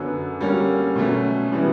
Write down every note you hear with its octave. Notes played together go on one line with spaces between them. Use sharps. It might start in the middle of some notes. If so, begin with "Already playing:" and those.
Already playing: F#2 D3 F#3 B3
D3 G3 A#3 C#4
B2 F#3 A3 C#4
C#3 E3 G3 B3 E4